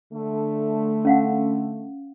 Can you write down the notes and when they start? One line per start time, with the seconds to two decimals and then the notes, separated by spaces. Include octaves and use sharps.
0.13 D3 A3
1.05 C#4 F5 F#5